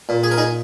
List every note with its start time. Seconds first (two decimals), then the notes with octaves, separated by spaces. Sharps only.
0.09 A#2
0.23 G#4
0.31 A#4
0.38 D#4 G#4